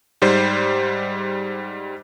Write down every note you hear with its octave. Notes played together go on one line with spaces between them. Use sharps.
G#2 G3 C5